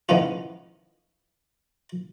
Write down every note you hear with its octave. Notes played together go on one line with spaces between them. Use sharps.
A2 D#3 F3 B3 C#4 F4